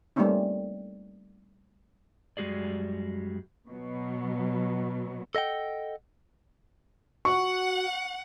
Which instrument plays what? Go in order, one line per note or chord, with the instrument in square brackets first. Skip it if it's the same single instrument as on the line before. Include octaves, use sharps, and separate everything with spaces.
[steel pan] G3 A3 A#3 C4 C#4 D#4
[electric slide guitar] F#2 G3 G#3 F#4 G#4 D5
[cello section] B2 F#3
[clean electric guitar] A4 D#5 F#5 G5
[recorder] F#4 [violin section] F#5 [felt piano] C#6